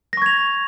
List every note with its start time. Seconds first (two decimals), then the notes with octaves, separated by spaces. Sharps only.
0.13 A#6
0.17 C#6
0.22 G#6
0.26 F7